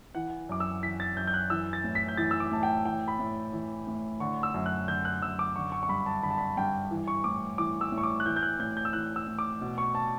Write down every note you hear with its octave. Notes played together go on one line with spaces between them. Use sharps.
E3 F#5
F#2 D6
E6
E3 B6
A6
F#2 G6
G6
F#6
E3 E6
A6
A2
B6
G6
E3 A6
E6
D6
A2 A5
G5
E3 G5
B5
A2
E3
A2
D3 C#6
E6
F#2
F#6
D3 G6
F#6
F#2 E6
D6
D3 C#6
C#6
C#6
G2 B5
A5
D3 B5
A5
B5
G2 G5
E3
C#6
A2 D6
E3 D6
E6
A2
C#6
D6
F#6
E3 G6
G6
F#6
A2 G6
G6
E6
E3 F#6
E6
A2
D6
B2
C#6
A5